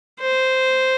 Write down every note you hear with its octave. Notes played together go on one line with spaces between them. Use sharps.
C5